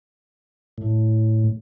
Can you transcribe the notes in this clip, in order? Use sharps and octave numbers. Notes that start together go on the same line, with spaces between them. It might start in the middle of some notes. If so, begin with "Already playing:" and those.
A2